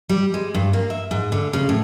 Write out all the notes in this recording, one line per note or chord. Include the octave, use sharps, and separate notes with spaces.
G3
G#3
G2
A#3
E5
G#2
D3
C#3
A2